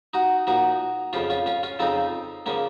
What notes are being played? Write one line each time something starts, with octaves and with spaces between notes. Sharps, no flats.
D#4 F#4
A#2 F3 D#4 F#4
F2 C#3 F3 C#4 F4
C#4 F4
C#4 F4
C#4 F4
F2 C#3 F3 C4 D#4
C#3 F3 A#3 C#4